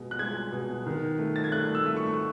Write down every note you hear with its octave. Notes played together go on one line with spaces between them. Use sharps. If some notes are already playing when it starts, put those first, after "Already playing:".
Already playing: B2 G#3
F#6
G#3 G#6
B2
D#3
A3
A6
G#6
A3 F#6
E6
A3
C#6
C#6